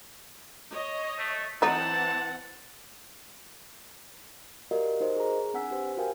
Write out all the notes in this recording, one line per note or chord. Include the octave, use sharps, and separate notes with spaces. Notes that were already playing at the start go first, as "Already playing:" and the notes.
C#5 D#5
A3
E3 F#3 C4 D#4 F#5 A5
F#4 G4 A#4 D5 D#5 F5
D#4 F#4 A#4 C5 D#5
G#4 A#5
C4 D4 F#5 G#5 E6 B6
G4 B4 C5
F#4 A#4 F5 G5 G#5